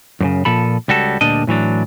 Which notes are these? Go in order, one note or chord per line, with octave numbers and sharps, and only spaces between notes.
F#2 A#2 C#3
A#2 F3 A4 B5
C#2 G3 F#4 A4
D2 A#2 G3 D4 D#5
A2 E3 F#3 D4